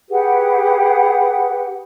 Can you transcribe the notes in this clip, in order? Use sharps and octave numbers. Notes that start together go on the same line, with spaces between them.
G4 G#4 B4 F#5